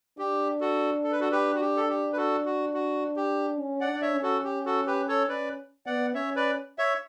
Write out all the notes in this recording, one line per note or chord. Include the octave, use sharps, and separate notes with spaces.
D4 G4
F#4 A4
A4
B4
F#4 A4
G4 B4
F#4
G4
A4
G4
B4
F#4 A4
F#4
F#4
G4
C#4
D5 F#5
D4
D5
C#5 E5
C#4
F#4 A4
G4
F#4 A4
G4 B4
A4 C#5
C#4 B4 D5
B3 D5 F#5
C#4 C#5 E5
B4 D5
C#5 E5